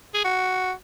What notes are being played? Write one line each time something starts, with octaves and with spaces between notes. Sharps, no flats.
G#4
F#4